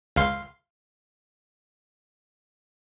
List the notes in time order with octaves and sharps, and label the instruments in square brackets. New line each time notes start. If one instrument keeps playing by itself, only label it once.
[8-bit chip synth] C#2 F5 C6